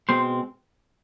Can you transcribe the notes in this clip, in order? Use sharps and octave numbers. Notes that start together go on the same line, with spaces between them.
B2 G#3 C4 C5